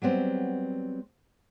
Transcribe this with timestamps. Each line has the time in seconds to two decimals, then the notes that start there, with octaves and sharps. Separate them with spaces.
0.02 F#3 G3 B3 C4